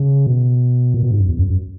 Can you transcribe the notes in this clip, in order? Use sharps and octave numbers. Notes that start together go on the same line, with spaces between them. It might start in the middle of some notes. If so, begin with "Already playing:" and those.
Already playing: C#3
B2
A#2
B2
G#2
F#2
E2
F#2
F#2